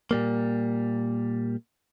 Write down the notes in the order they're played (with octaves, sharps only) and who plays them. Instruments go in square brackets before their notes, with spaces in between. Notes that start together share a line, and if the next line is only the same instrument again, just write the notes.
[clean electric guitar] A#2 G3 A#3